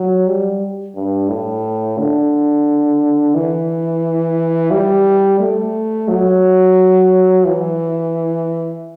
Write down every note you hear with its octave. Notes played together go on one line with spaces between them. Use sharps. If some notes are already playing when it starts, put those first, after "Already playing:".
Already playing: F#3
G3
G2
A2
D3
E3
G3
A3
F#3
E3